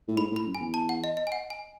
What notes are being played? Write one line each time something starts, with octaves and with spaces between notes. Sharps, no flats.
A2
G#2 B5
A2
B5
F#2
G#5
E2
A5
F#5
D#5
D#5
G#5
F#5
G#5